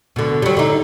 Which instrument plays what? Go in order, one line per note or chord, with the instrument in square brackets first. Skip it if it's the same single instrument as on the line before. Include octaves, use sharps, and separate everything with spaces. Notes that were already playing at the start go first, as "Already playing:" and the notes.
[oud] B2 D3
F#3 G3
D3 D#4